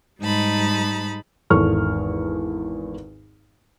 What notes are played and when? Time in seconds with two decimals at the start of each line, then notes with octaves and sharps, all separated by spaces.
0.20 G#2 G3 G#3 D#4 A5 B5
1.50 G#1 E2 A4 C#6 F6